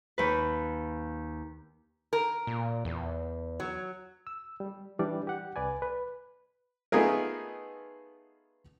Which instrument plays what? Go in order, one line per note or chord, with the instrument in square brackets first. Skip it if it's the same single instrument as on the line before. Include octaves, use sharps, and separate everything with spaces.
[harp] D#2 B4
[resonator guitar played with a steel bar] A#4
[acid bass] A#2
E2
[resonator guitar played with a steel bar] F#3
[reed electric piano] E6
G3
E3 G3 D4 D5
G4 F#5
C2 B4 D5 G#5
B4
[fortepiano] A3 B3 D#4 F4 G#4 A#4